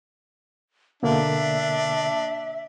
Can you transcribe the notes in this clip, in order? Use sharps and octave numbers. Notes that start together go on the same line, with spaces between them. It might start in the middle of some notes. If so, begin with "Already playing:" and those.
B2 D3 A#3 D4 E5